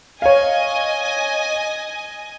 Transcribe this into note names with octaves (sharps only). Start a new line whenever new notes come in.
C#5 D#5 F5 G#5